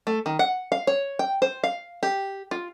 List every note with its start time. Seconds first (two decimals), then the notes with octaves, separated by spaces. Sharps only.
0.07 A3
0.26 D#3
0.39 F#5
0.72 F5
0.87 C#5
1.19 G5
1.42 C5
1.64 F5
2.03 G4
2.51 F4